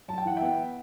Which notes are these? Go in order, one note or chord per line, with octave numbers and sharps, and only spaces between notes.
F#2 A5
G5
E3 F#5
E5 G5
B3